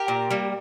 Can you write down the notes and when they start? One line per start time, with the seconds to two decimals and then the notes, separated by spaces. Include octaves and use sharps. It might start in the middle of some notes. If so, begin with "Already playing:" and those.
Already playing: G4 A#4
0.08 A#2
0.31 G3 A#3